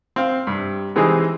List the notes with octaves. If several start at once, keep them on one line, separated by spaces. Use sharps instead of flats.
C4 F5
G2 C3
C3 E3 G#3 C4 D#4 G#4